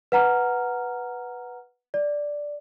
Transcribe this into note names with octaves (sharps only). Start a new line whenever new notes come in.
B4 F#5 A#5 F6
D5